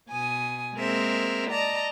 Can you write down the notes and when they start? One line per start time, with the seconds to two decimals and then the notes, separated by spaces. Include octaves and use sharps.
0.11 B2 G#5 D#6
0.76 G#3 A#3 C4 G#4 A#4 E5
1.51 D5 D#5 A5 A#5